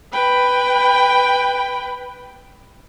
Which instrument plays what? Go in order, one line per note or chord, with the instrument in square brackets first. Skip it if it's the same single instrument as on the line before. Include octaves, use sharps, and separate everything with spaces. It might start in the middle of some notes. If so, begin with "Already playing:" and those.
[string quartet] B4 G5 B5